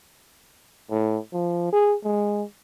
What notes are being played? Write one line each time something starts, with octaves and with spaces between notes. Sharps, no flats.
A2
F3
G#4
G#3